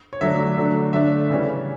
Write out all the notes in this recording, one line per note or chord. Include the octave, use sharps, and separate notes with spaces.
C#5
D3 F#3 A3 D4 E5
D3 F#3 A3 D4
D3 A3 D4 E5
C#3 E3 G3 C#4